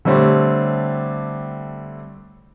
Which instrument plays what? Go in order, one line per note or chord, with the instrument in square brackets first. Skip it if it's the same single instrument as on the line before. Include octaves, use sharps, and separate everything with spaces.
[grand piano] D3 G3 A3 C4 G4 C#5